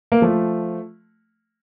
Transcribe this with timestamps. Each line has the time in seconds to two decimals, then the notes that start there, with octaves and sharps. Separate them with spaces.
0.12 A#3
0.22 F3 A3